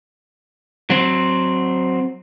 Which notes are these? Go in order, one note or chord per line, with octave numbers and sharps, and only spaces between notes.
F#3 C4